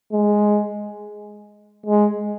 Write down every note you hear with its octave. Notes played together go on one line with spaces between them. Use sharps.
G#3
G#3